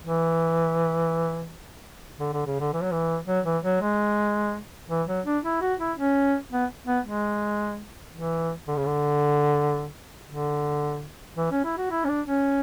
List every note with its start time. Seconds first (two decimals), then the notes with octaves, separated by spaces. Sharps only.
0.04 E3
2.20 D3
2.33 D3
2.46 C#3
2.60 D3
2.73 E3
2.82 F#3
2.92 E3
3.27 F#3
3.45 E3
3.64 F#3
3.81 G#3
4.90 E3
5.08 F#3
5.26 D4
5.44 E4
5.61 F#4
5.80 E4
5.97 C#4
6.52 B3
6.87 B3
7.06 G#3
8.13 E3
8.68 D3
8.76 C#3
8.86 D3
10.29 D3
11.37 E3
11.51 C#4
11.64 E4
11.78 F#4
11.91 E4
12.04 C#4
12.09 D4
12.27 C#4